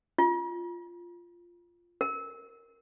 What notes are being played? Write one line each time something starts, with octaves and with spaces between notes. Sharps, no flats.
F4
A#4